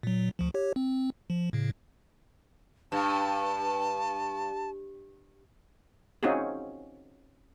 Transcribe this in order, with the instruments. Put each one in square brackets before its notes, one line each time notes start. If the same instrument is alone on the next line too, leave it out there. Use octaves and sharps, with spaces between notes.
[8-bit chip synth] A#2 F#3
D2 F3
G4 C#5
C4
F3
A2 C#3
[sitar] G2 [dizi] A5
[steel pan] C4 C#4 D#4 F4 F#4 G#4